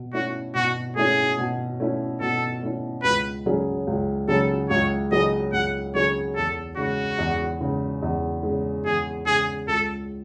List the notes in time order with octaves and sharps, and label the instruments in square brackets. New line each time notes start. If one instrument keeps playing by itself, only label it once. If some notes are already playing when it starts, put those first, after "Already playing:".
Already playing: [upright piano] B2
[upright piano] A3 C#4 E4 [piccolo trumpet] F#4
[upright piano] B2 [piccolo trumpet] F#4
[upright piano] A3 C#4 E4 [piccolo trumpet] G#4
[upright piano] B2
A3 C#4 E4
[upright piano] B2 [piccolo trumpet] A4
[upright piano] A3 C#4 E4
[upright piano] C#2 [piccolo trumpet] B4
[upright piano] C#3 F#3 C#4 G#4
C#2
[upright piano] C#3 F#3 C#4 G#4 [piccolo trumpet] A4
[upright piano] C#2 [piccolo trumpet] C#5
[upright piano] C#3 F#3 C#4 G#4 [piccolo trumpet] D#5
[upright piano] C#2 [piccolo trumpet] F#5
[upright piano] C#3 F#3 C#4 G#4 [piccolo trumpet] C#5
[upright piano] E2 [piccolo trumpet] A4
[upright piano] C#3 G#3 [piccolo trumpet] F#4
[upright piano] E2
C#3 G#3
E2
C#3 G#3
[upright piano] E2 [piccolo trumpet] G#4
[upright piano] C#3 G#3 [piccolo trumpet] G#4
[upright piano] C#2 [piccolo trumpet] A4